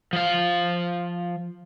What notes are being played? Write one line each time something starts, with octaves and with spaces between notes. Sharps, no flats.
F3 F5